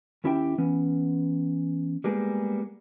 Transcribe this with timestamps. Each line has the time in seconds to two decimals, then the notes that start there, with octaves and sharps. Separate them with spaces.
0.24 D#2 C#4 E4 G4 E5 G5
0.58 E3 B3 C#4
2.04 G3 G#3 A#3 B3 G4 G#4